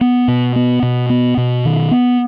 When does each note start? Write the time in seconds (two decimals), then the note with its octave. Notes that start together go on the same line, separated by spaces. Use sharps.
0.01 B3
0.28 B2
0.56 B3
0.83 B2
1.10 B3
1.37 B2
1.65 D#3
1.91 B3